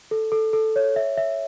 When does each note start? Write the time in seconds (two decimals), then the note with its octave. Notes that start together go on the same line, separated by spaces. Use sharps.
0.11 A4
0.32 A4
0.53 A4
0.76 C#5
0.96 E5
1.17 E5